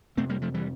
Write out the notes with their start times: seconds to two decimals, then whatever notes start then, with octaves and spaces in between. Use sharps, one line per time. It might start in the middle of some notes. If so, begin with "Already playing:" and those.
0.17 F2 C3 A3 C4
0.29 G3 A#3
0.42 F3 A3
0.54 E3 G3